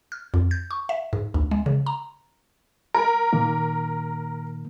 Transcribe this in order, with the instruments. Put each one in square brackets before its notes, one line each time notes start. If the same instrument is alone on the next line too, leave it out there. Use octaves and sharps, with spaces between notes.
[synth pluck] F6
F2
G6
C#6
E5
G#2
D2
G#3
C#3
A#5
[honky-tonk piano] A#4
[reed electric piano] A#2 D#3 A#3